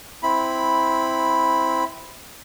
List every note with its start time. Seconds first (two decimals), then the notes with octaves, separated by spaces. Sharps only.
0.23 C4 E4 B5